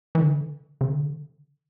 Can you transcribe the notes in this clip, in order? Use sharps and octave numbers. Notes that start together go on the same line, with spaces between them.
E3
D3
C#3
D3